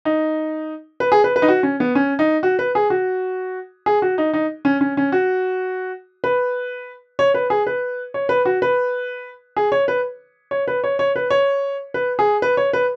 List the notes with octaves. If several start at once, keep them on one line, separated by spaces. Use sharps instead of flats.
D#4
B4
G#4
B4
B4
D#4
F#4
C#4
B3
C#4
D#4
F#4
B4
G#4
F#4
G#4
F#4
D#4
D#4
C#4
C#4
C#4
F#4
B4
C#5
B4
G#4
B4
C#5
B4
F#4
B4
G#4
C#5
B4
C#5
B4
C#5
C#5
B4
C#5
B4
G#4
B4
C#5
B4